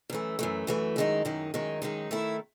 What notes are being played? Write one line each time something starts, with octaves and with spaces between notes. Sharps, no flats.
F#2 E3 A3
F#2 E3 A3
F#2 E3 A3
F#2 D#3 G#3 D#4
F#2 D#3 G#3 D#4
F#2 D#3 G#3 D#4
F#2 D#3 G#3 D#4
D#3 A3 E4